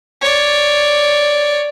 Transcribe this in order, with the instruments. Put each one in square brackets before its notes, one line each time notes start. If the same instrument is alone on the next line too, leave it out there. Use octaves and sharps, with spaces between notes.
[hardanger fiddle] C#5 D5